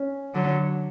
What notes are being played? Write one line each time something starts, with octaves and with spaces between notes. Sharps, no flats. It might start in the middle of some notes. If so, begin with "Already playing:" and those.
Already playing: C#4
D3 F#3